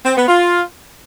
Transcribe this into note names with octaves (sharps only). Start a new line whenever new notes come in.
C4
B3
F4